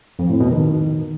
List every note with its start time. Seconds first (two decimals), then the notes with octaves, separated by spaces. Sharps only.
0.19 F2
0.29 A2
0.40 B2
0.51 D#3